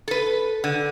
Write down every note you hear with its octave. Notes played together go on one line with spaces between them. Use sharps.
A4 B4
D3